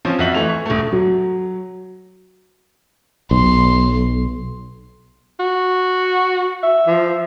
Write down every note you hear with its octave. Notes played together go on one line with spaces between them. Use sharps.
F3 C4 C#4
F2 F#4 E5 F#7
E3 A3 F7
C#6
D#1 A3
F#3
B1 C6
F#4
E5
F3